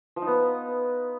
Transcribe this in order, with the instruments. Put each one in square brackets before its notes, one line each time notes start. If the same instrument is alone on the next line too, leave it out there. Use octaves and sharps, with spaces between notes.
[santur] F3
D#4
B3